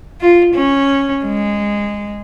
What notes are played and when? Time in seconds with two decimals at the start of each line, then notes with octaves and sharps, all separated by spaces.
0.21 F4
0.54 C#4
1.24 G#3